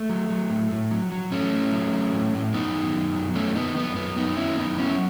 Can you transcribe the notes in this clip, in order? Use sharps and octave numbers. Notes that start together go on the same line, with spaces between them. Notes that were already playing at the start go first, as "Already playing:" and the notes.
Already playing: A3
F#3
F#3
A2
A2
F#3
F#3
A2 A3 C#4
A2
F#3
F#3
A2
A2
F#2 B3 D#4
D#3
F#2
F#3
F#2 A3 C#4
D#3 B3 D#4
F#2 B3
F#3 B3
F#2 B3 D#4
D#3 C#4 E4
F#2 B3 D#4
F#3 C#4 E4